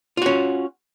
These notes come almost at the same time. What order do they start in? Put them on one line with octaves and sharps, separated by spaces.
F4 F#4 C#4